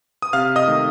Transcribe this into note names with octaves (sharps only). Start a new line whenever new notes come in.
D#6
C3 F5 F6
D#5 D#6
D#3 A3